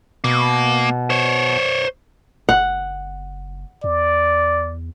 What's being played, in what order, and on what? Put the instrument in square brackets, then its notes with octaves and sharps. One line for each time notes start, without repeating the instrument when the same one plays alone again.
[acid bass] B2 [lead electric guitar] A#3
[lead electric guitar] C5 C#5
[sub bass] F#1 [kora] F#5
[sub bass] E2 [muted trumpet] D5